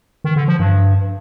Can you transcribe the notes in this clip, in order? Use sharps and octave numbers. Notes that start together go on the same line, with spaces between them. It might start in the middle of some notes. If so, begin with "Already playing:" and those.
D#3
D3
F3
G2